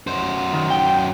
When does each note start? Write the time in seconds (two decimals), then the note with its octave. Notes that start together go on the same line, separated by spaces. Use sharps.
0.07 F#2 C5
0.54 D#3
0.70 G5